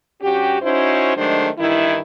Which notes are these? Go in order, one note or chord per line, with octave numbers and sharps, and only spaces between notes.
G2 C#4 F#4 G4
C#4 D#4 E4 F#4 C5
D#3 F#3 G#3 A3 D4 C5
G2 D#3 E3 E4